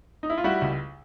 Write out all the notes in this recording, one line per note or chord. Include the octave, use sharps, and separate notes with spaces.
D#4
E4
F4
G3 E4 F#4
C#2